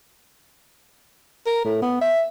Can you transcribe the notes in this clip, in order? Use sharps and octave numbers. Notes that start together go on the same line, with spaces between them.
A#4
A2
B3
E5